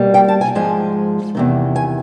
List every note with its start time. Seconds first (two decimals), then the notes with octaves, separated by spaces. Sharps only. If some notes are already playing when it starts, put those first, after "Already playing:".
Already playing: B2 G3 A#3
0.14 G5
0.29 A5
0.41 G#5
0.55 G#2 F3 G#3 G#5
1.35 E2 C3 D#3
1.76 G#5